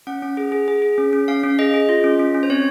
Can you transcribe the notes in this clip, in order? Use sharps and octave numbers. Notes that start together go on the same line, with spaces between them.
C#4 F#5
C#4
G#4
G#4
G#4
G#4
C#4
C#4
C#4 F5
C#4
G#4 D#5
G#4
F4
C#4
C#4
C#4
C5
C4 C#5